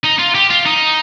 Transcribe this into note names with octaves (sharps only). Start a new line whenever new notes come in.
D#4
F4
G4
F4
D#4